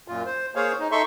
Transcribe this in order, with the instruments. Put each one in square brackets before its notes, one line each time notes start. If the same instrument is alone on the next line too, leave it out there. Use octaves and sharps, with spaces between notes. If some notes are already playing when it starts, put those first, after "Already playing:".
[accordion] F#2 A#2 F4
C5
A#3 G#4 C5 C#5 F5
D#4
D#4 A4 E5 C6 C#6